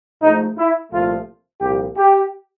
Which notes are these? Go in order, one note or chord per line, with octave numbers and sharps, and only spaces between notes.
G#2 F3 A3 D#4
E4
C2 A#2 F3 A3 F4
C2 A#2 F3 G4
G4